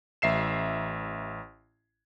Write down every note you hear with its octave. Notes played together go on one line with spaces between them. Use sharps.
A1 E5 C7 E7